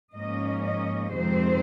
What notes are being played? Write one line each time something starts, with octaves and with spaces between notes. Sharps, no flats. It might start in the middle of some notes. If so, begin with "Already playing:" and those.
G#2 F3 A#3 C#4 D#5
D#5
F2 C3 D#3 G#3 C4 C5